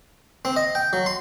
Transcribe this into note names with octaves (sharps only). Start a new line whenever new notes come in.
C4
D#5
G5
F#3
C6